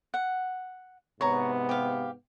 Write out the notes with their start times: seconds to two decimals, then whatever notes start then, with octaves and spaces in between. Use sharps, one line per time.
0.14 F#5
1.21 G#2 C3 B3 C#5 A#5
1.69 G4 F5